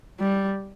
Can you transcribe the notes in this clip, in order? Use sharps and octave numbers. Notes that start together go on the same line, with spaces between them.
G3